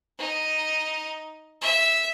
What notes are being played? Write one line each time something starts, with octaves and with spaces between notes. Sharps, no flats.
D#4
E5